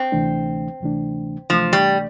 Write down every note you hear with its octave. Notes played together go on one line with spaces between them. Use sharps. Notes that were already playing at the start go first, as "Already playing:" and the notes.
Already playing: C4
D2 C3 E3 A3 D4
D2 C3 E3 A3 D4
D2 C3 E3 F3 A3 D4
G3